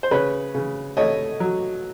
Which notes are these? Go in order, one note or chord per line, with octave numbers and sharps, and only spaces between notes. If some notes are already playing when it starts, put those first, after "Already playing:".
C5
C#3 B4 C#5
C#3
A3 C#5 D#5
F#3